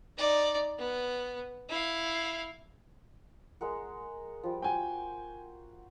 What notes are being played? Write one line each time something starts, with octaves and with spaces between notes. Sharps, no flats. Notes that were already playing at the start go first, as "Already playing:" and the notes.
D#4 D5
B3
E4 F5
G#3 A#4 F#5
F3 G3
F#4 C5 G5 G#5